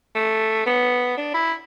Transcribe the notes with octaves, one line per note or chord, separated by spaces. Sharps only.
A3
B3
D4
E4